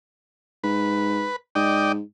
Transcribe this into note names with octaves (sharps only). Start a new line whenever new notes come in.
G#2 B4
G#2 D5 D#5 G5